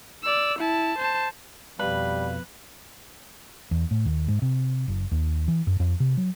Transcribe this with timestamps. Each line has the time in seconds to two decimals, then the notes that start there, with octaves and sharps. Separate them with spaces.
0.23 D5 E6
0.59 E4 A5
0.98 C5 A5
1.79 F2 B2 G3 B4 F5
3.71 E2
3.91 A2
4.05 D#2
4.28 G#2
4.42 C3
4.88 F#1
5.11 D#2
5.48 E3
5.67 F#2
5.80 F2
6.00 C3
6.17 F#3